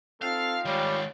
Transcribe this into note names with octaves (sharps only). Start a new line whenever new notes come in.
C4 D#4 F4 A4 F5 G5
D#3 G3 G#3 C#5